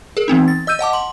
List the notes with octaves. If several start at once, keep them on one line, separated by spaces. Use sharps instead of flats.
G#4 A#4
E3 B3 C4 D#4
A6
D#5 E6 G6 D#7
D#5 F#5 A5 D6
C6 F#7